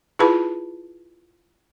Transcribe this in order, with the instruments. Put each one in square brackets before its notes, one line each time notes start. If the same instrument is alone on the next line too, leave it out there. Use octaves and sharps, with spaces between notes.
[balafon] E4 F4 G#4 B4 A5 B5